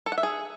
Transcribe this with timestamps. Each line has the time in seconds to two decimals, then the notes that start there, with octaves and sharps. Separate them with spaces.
0.06 A4
0.12 F#5
0.18 E5
0.23 G#4